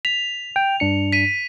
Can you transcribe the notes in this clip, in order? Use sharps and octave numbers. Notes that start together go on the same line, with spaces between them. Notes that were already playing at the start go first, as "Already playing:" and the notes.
B6 F7
G5
G2 D4 C#7
B6 D#7